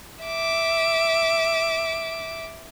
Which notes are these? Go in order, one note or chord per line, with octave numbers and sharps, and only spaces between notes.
E5 D6